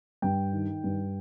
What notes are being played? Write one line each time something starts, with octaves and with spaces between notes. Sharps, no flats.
G2 G5
D#3
G2